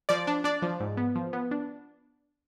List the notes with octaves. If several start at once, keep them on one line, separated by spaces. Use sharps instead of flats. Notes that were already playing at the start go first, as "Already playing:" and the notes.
F3 D5
D4
D4 D5
F3
G#2
B3
F3
B3
D4